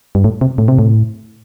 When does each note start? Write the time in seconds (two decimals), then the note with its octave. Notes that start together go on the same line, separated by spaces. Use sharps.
0.15 G2
0.24 A2
0.41 C3
0.58 A2
0.68 C3
0.79 A2